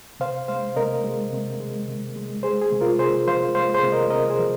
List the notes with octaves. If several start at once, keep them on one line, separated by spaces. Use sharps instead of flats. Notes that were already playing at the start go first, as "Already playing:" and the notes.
C3 C5 F5
G#3 C5 F5
C3 A#4 D#5
G#3
C3
G#3
C3
G#3
G#3 G#4 C5
G#4
C3
F4 A#4
C3 G#4 C5
F3 C5 F5
G#3 C5 F5
G#4 C5
C3
A#4 D#5
C3 A#4 D#5
G#4 C5
F3